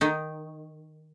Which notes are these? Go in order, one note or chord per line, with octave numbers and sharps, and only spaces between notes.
D#3 D#4